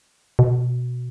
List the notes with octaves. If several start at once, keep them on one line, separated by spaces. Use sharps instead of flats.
B2